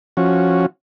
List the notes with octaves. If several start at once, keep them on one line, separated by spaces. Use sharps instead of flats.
F3 C#4 F#4